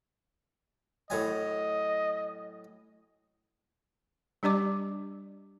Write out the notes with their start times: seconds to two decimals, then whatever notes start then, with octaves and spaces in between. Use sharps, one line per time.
1.10 A2 F#3 D#5 G#5
4.43 G3 D4 G4 D5 D6